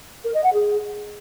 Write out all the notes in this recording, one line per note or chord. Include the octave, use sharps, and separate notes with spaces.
A#4
D#5
F#5
G#4